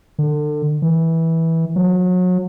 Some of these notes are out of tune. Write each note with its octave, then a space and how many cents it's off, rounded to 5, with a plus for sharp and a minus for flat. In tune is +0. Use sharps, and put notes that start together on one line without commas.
D3 +30
E3 -15
F#3 -30